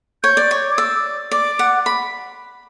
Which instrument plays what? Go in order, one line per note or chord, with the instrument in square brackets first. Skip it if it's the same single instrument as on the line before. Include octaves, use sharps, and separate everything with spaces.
[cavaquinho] C#5 [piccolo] G6
[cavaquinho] D5
C#5
[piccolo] D6
[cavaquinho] D5 [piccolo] E6
[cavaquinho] D5 [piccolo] D6
[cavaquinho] F#5
B5